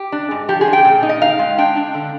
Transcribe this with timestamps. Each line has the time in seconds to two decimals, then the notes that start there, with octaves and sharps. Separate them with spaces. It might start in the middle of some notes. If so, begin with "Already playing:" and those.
Already playing: G4
0.12 D4
0.31 G#2
0.49 F3 G4
0.61 G#4
0.67 D4
0.73 G5
0.85 A#2
1.03 D#4
1.09 D#5
1.22 D#4 F5
1.39 G#3
1.58 D4 G5
1.76 D4
1.94 D3